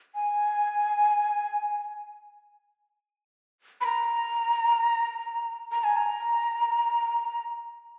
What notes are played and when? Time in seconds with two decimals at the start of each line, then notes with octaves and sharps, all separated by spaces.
0.15 G#5
3.81 B5
3.86 A#5
5.72 A#5
5.84 G#5
5.97 A#5